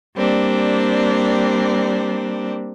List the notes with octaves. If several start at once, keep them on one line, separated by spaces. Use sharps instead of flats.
G3 A#3 C4 D4